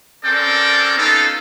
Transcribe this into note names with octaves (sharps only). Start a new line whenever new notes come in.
C4 C#4 A4 A#4 D5 G5
B3 C#4 D#4 F4 A4